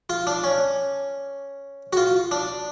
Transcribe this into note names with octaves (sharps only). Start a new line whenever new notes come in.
F4
D4
C#4
F#4
F4
D4